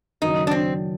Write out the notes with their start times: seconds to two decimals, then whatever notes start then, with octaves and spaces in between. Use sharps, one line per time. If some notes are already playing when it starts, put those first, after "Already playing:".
0.22 F#1 F#2 D#3 F#3 D#4
0.47 D4
0.51 C4